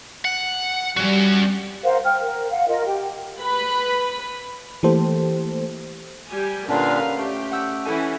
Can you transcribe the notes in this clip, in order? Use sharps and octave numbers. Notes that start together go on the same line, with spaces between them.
F#5
G3 C#4 F#4
A#4 C5 F5 F#5
G5 F6
A#4
F5 F#5
F4 A#4 D#5
G4 G5
B4 B5
E3 A3 A#3 G4 A4 C5
G3 G4 G#5
A#2 D3 C#4 D4 A#4 B4 F5
A3 G4
F#5 E6 G6
E3 C#4 E4 A4 G#5